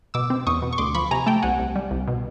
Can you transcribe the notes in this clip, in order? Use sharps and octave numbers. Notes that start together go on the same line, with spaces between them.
B2 D6 E6
C4
E2 C#6 D#6
B2
C#6
D2 C6 D6
F3 B5 C#6
C3 G#5 A#5
A3 G5 A5
C2 F#5 G#5
C2
G3
C2
B2